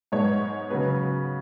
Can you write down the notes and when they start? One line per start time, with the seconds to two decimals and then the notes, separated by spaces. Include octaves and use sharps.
0.12 G#2 G#3 B3 C#5
0.70 C#3 F#3 B3 B4